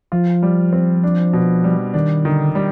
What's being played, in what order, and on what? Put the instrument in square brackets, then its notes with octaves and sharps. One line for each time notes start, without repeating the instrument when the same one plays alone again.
[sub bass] F3 [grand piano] F4
[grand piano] G3
C4
D4
B2
G3
[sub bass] D#3 [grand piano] D4
[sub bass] D3 [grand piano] D#3
[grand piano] G3